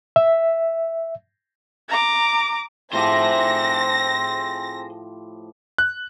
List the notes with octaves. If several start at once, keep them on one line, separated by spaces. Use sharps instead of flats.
E5
A#5 D6
A2 F3 C4 G4 G#4 C5 A#6
F#6